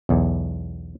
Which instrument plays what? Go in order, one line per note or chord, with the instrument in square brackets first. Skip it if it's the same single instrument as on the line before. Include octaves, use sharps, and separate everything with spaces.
[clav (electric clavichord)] B1 E2